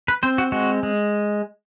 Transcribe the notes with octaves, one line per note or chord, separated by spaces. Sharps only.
B4
C4 C5
F#4
G#3 F#4
G#3